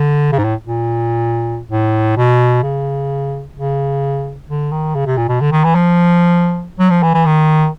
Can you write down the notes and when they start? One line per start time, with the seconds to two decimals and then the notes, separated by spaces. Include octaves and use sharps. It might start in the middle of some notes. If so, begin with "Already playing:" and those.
Already playing: D3
0.32 C#3
0.38 G#2
0.44 A2
0.67 A#2
1.71 A2
2.17 B2
2.63 C#3
3.56 C#3
4.49 D3
4.71 D#3
4.95 C#3
5.06 C3
5.17 A#2
5.28 B2
5.41 D3
5.52 D#3
5.64 E3
5.75 F3
6.79 F#3
6.90 F3
7.03 E3
7.14 E3
7.26 D#3